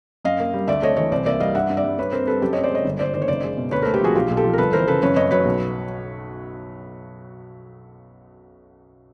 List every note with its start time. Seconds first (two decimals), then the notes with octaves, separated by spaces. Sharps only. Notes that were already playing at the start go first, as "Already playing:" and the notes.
0.25 F#2 D#5 F5
0.40 A#3
0.53 G3
0.68 D2 D5 E5
0.82 A3 C#5 D#5
0.97 E3 C#5 D#5
1.12 C2 C5 D5
1.26 A#3 D5 E5
1.40 G3 D#5 F5
1.55 G2 E5 F#5
1.70 G2
1.77 D5 E5
1.84 G3
1.99 G2 B4 C#5
2.12 C4 A#4 C5
2.27 G3 A4 B4
2.42 F#2 G4 A4
2.53 C4 C#5 D#5
2.63 C5 D5
2.70 G#3 C#5 D#5
2.85 G1
2.99 G1 C5 D5
3.13 D#3 C5 D5
3.22 C#5
3.28 F#1 C5 D5
3.44 G#3
3.57 B2
3.71 D2 B4 C#5
3.82 A3 A#4 C5
3.94 G4 A4
4.00 F3 F#4 G#4
4.15 B1 F4 G4
4.30 B1
4.37 G4 A4
4.44 F3
4.53 A#4
4.58 G1 A4 B4
4.73 E3 A#4 C5
4.87 C#3 A4 B4
5.02 F#2 B4 C#5
5.16 F#2 C#5 D#5
5.31 F#3 B4 C#5
5.45 B1